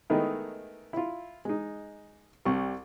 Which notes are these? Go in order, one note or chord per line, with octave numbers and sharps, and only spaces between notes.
D#3 G#3 A3 B3 D#4 E4
E4 F4
G#3 D#4
C2 G3 C#6